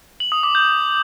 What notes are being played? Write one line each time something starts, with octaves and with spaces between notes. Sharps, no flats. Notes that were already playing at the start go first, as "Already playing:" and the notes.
F#7
D#6
D6
G6